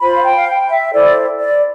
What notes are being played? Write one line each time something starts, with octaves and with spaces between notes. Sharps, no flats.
F4 C5 B5
F5
G5
F5
G5
E5
E4 A4 C5 D5
D5